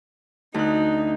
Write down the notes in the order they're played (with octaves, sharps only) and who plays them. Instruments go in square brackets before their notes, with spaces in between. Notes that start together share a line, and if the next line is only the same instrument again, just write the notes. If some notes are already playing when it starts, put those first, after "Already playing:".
[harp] D2 F#6 [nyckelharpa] D#4